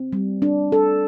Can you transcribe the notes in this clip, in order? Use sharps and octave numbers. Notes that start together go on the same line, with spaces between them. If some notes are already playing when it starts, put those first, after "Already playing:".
Already playing: C4
G3
D4
A4